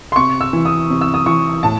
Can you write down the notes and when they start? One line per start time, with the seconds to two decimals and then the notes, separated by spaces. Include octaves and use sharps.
0.12 C6
0.16 C3 C#6
0.41 E6
0.53 E3
0.65 D#6
0.90 C3
1.01 E6
1.14 D#6
1.26 E3 C#6
1.63 A2 A5